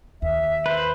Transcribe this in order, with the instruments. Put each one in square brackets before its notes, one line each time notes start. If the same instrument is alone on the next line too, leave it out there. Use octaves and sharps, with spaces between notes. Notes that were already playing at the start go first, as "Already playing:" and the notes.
[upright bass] D#2 [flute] E5
[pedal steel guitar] B4 C5